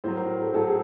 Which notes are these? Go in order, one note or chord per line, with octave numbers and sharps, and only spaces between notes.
A2 F#3 C5
A#4
A4
A2 F#3 A4
G#4